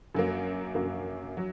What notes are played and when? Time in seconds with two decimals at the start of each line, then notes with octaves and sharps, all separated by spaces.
0.15 F#2 F#3 A#3
0.75 F#2 F#3 A#3
1.37 F#3